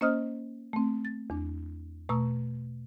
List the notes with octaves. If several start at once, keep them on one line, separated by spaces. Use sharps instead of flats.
A#3 C#4 C5 D#5 D#6 F6
A3 C4
A6
E2 D4
B2 A3 A#5 C#6 E6